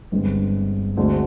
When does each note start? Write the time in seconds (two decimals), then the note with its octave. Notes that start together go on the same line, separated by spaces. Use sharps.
0.12 G1 G2 D3 G#3 C4
0.97 D2 D3 G#3 C4